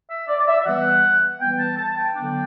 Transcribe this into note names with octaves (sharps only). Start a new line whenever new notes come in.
E5
D5
D5
E5
E5
E3 G3 B3 F#5
E3 G3 B3 G5
A5
A5
G5
D3 F#3 B3 D4